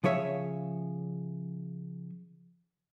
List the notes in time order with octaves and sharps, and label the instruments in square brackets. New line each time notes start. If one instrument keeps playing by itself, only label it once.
[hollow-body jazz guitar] C#3 F3 G#4 C#5 E5